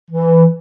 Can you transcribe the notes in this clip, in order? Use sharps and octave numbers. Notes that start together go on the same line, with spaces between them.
E3